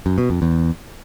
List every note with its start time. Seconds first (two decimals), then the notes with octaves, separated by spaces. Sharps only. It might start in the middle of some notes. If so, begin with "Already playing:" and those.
0.06 F#2
0.18 B2
0.30 F2
0.42 E2